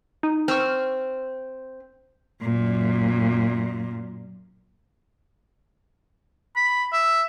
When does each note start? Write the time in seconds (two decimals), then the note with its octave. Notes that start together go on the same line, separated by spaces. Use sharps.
0.23 D#4
0.48 C4 C#6 E6 F6
2.42 F#2 A#2
6.56 B5
6.93 E5